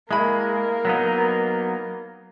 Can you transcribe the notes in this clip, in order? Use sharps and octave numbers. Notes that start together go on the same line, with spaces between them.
G#3 A#3 E4 B5
F#3 B3 D#4